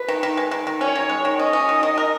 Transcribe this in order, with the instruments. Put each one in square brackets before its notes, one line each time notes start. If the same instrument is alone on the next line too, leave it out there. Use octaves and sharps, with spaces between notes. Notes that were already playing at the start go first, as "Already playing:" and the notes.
Already playing: [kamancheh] B4
[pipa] D#3
D#3
G#3
D#3
D#3
[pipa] C#4 [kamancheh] C#5
[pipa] D#3
G#3
D#3
[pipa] C#4 [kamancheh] D#5
[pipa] C#4
D#3
D#3
A#4